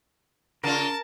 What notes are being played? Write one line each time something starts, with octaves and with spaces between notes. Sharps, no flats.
C#3 F4 A#4 A5